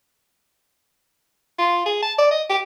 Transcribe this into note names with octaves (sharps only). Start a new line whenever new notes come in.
F4
G#4
A5
D5
D#5
G4